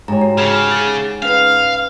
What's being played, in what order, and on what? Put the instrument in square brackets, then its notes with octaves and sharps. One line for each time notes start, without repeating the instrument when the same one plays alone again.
[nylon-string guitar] G#2 G4 C#5 [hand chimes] A#5
[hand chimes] F#4
[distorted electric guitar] C#3 [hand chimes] G#4 G#6
[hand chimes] G#4 A6
[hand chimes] C#4 B4 [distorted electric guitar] F5